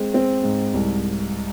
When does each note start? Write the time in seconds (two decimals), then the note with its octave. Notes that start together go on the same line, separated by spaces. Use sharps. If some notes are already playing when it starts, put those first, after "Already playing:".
Already playing: G#3 C4
0.14 C4
0.44 G#2
0.74 C2